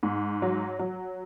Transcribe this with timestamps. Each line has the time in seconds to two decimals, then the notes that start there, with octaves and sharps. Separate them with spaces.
0.03 G#2
0.42 F#3
0.79 F#3